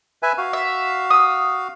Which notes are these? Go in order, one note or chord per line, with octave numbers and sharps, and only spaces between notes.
B4 E5 G#5
F#4 F5
E5
D#6 E6